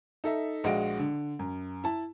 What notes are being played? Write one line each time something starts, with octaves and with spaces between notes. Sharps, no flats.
D#4 A4 E5
A#1 G#3 F#4 D#5 F5 D7
D3
F#2
E4 A5